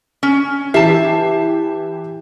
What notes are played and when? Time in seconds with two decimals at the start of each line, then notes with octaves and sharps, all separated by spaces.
0.23 C#4
0.74 E3 G4 E5 A5 C7